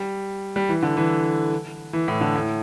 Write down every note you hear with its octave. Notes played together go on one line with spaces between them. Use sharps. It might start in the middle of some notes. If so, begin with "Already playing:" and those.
Already playing: G3
G3
E3
D3
E3
E3
A2
D3
A2